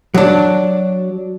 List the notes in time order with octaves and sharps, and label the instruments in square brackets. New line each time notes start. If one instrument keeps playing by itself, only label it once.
[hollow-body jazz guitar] F#3 D4